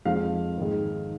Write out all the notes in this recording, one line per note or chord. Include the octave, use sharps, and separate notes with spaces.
F2 F3 G#3 F5
G#2 D#3 G#3